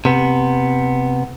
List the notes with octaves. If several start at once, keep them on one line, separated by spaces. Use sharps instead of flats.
C3 B3